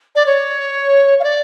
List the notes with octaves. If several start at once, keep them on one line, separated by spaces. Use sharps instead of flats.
D5
C#5
F5
D5